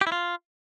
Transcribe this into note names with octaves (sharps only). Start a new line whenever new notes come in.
G4
E4
F4